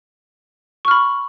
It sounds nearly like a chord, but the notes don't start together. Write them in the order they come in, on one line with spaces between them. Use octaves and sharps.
C#6 F6 B5